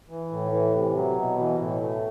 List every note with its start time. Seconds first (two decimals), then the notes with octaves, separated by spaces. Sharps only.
0.09 E3
0.31 A2
0.52 E3
0.74 C3
0.95 F#3
1.17 B2
1.38 E3
1.61 A2
1.81 A3